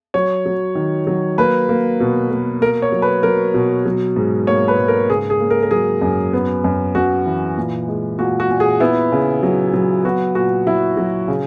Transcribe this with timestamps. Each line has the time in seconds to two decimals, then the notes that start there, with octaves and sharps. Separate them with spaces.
0.14 F#3 C#5
0.46 F#3
0.75 D#3
1.07 F#3
1.38 A#3 B4
1.69 A#3
2.00 B2
2.31 A#3
2.61 A#3 A#4
2.82 C#5
2.92 F#3
3.02 B4
3.23 F#3 A#4
3.54 B2
3.86 F#3
4.16 G#2
4.47 A#3 C#5
4.68 B4
4.78 G#2
4.88 A#4
5.09 C#3 G#4
5.30 G#4
5.40 A#3
5.50 A#4
5.63 A#4
5.71 F#3 G#4
6.02 F#2
6.33 B3
6.64 F#2
6.95 F#2 F#4
7.26 E3
7.58 A#2
7.88 G#3
8.19 A#2 F#4
8.40 F#4
8.50 A#2
8.60 G#4
8.80 B3 E4
9.12 C#3
9.43 F#3
9.74 F#3
10.04 B3 F#4
10.35 A#2 F#4
10.67 F#3 E4
10.97 F#3
11.28 C#3